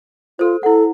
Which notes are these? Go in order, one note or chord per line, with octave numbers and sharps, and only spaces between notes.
F4 A4 C5
E4 A4 F#5